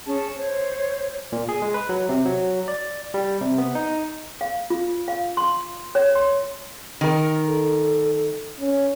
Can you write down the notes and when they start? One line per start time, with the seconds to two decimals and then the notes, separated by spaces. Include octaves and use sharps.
0.06 C#4 G#4 A5
0.36 C5 C#5
1.32 A#2
1.49 G#4
1.62 G#3
1.74 B4
1.89 F#3
2.09 C3
2.25 F#3
2.68 D5
3.14 G3
3.41 C3
3.58 B3
3.75 D#4
4.41 F5
4.70 F4
5.08 F5
5.37 C6
5.95 C#5
6.15 C6
7.01 D#3 A#4
7.47 A4
8.60 C#4